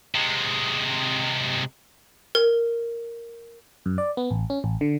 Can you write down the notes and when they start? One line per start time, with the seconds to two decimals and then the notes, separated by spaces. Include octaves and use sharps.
0.15 C3 G#3
2.35 A#4
3.86 F#2
3.98 D5
4.17 B3
4.31 A1
4.50 C#4
4.64 A1
4.81 D3